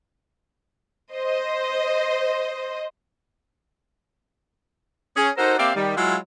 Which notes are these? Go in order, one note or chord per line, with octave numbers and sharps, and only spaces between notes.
C5 D#5
C#4 G#4
D#4 F#4 A4 A#4 C5
A#3 C4 G4 D5 E5 F5
D#3 G3
F#3 G#3 E4 F4